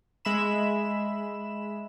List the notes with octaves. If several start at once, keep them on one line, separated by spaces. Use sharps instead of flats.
G#3 E5 B5 E7